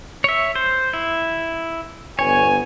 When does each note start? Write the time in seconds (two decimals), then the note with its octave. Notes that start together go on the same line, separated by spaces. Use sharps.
0.24 C#5 E5
0.55 C5
0.93 E4
2.19 G1 B3 C#5 G#5